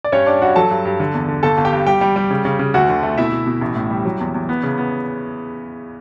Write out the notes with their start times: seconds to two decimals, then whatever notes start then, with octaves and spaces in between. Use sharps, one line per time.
0.04 D5
0.12 G2 C#4 C#5
0.26 G3 D4 D5
0.42 G2 F#4 F#5
0.56 F#3 A4 A5
0.71 G2
0.85 G2
1.00 D3
1.14 E2
1.28 D3
1.43 G1 A4 A5
1.58 G1
1.65 G4 G5
1.72 G2
1.87 G3 G4 G5
2.01 G3
2.16 G3
2.31 C#3
2.45 C#3
2.59 C#3
2.74 D2 F#4 F#5
2.89 D3
3.03 A3
3.18 B2 E4 E5
3.32 B2
3.47 B2
3.61 A1
3.75 A2
3.90 G3
4.05 F#3
4.20 E2
4.34 E2
4.49 B3
4.63 C#3
4.78 B3